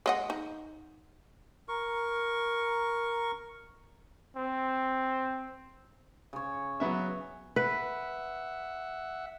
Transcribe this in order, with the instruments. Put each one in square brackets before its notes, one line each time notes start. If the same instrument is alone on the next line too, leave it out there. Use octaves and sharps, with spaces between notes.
[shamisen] G#3 D#5 F#5
D#4
[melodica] A#4 C#6
[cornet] C4
[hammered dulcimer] C#3 C#5
[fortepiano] F#3 B3 E5
[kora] B4 [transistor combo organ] E5 F#5